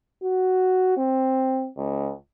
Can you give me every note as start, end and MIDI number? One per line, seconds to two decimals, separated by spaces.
0.23 0.92 66
0.97 1.68 60
1.77 2.11 37